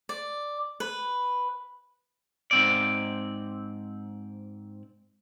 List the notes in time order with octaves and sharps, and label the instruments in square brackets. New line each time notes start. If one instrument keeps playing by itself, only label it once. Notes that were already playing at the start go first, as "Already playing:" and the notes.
[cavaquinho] D5
B4
[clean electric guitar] G#2 C4 D5